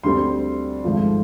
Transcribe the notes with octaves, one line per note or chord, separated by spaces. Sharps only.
D2 D3 G3 C4 C6
G#1 G#2 F3 A3